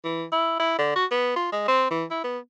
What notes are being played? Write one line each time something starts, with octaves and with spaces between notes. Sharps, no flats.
E3
E4
E4
D3
F#4
B3
F4
G#3
C4
E3
E4
B3